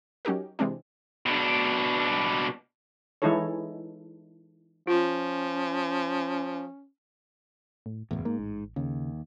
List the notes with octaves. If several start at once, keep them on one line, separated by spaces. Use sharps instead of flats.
F#3 C#4 D#4 G4 A#4
C3 E3 G#3 C4 D4
B2 D4
E3 G#3 D#4 E4 A4 C#5
F3 C#4 F4
A2
F#1 E2 A2
G#2 A#3
A1
D#2 C#3